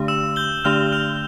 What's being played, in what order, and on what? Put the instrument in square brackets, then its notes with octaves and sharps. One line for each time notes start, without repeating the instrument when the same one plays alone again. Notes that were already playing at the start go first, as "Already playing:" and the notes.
Already playing: [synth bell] D3 A3 D4 G4
[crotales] E6 E7
G6 G7
[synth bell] D3 A3 D4 G4 [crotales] F6 F7
[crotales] F6 F7